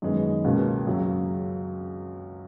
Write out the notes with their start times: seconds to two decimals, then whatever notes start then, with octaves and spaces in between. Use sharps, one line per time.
0.02 F#2 D#3 G#3 B3
0.44 C#2 B2 A#3 C#4
0.87 F#2 C#3 F#3